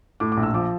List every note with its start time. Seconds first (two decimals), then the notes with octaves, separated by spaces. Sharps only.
0.20 A2 D6
0.32 D6
0.37 A#1
0.43 E6
0.54 F3 D6